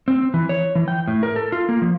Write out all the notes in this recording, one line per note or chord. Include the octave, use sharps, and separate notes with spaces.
C4
E3
C#5
E3
G5
A2
A#4
A4
F4
A#3
F3